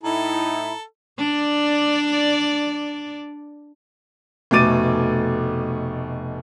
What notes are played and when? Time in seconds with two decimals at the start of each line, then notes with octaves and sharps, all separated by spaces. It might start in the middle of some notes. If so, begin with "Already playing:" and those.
0.03 A2 D#4 E4 A4 A#5
1.18 D4 D5
4.51 F1 B2 A3 D6 A6 D#7